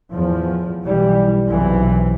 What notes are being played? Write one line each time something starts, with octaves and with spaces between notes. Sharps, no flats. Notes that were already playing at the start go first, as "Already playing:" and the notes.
E2 A2 F3
B1 E3 G3
B1 F#2 C3 E3